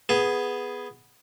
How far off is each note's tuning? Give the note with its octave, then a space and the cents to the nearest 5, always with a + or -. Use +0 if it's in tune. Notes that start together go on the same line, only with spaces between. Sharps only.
B3 +0 G#4 +0